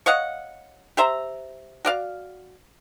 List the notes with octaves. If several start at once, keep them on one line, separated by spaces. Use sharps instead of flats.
C#5 D#5 F5 F#5
G4 C5 E5 A#5
F#4 D5 F5